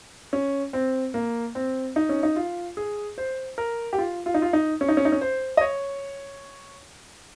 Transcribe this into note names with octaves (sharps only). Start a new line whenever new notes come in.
C#4
C4
A#3
C4
D#4
C#4
D#4
F4
G#4
C5
A#4
G4
F4
F4
D#4
F4
D#4
C#4
D#4
C#4
D#4
C#4
C5
D#5
C#5